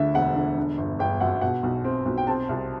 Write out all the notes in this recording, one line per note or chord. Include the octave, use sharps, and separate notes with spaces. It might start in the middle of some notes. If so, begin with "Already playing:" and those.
Already playing: D2 D3 E5
E1 F#5
D3
D3
G1
G1 G5
F#2 F#5
B2 F#5
B1
C4
B1
G5
C4 A5
C2